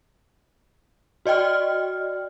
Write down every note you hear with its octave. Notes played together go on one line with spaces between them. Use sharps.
F#4 D5 D#5 G5 F6